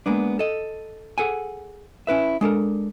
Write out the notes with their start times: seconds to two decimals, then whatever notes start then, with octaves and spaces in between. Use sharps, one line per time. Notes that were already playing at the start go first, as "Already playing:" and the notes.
0.06 G#3 A#3 B3 D4
0.39 A4 D#5
1.18 G#4 A4 F#5 G#5
2.07 C#4 E4 B4 E5
2.41 G#3 D4 A4 A#4